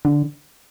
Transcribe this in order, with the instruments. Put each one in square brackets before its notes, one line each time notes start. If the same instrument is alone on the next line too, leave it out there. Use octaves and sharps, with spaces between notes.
[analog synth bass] D3